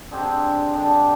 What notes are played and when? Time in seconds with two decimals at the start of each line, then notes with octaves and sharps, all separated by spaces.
0.11 D3 G#3 C4 G4
0.74 D3 G#3 D4 G4